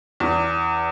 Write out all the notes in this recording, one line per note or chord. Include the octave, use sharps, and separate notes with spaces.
E2